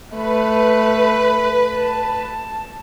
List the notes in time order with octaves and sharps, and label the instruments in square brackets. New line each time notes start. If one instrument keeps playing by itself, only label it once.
[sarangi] A3 [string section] B4
[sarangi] A5